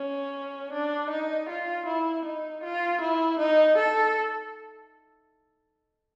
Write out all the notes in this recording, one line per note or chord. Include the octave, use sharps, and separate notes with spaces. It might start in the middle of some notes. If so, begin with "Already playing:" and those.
Already playing: C#4
D4
D#4
F4
E4
D#4
F4
E4
D#4
A4